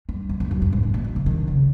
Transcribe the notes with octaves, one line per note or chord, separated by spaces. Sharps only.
G2
E2
F2
F#2
G2
G#2
A2
A#2
B2
C3
D#3
C#3